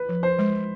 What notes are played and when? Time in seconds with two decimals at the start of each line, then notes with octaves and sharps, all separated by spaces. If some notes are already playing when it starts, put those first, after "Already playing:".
Already playing: B4
0.09 F3
0.23 C5
0.39 G#3